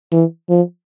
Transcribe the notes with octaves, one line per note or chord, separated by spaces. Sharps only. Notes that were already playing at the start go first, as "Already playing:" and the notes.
E3
F3